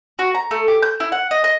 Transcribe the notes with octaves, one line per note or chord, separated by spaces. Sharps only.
F#4
A#5
A3
G4
G6
E4
F#5
D#5
D#5